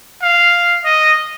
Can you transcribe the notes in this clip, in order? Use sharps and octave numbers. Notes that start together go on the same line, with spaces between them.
F5
D#5